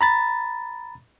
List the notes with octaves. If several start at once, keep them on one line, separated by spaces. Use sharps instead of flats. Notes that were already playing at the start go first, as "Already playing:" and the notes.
A#5 B5 A6